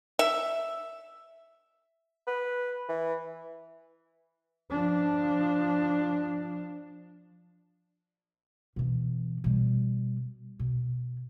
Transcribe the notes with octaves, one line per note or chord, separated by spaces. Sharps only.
E5
B4
E3
F3 D4
B2 E3
B2 G3
B2